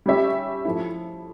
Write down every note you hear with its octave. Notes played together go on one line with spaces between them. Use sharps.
G3 C#4 G4 C#5 E5
F3 A3 E4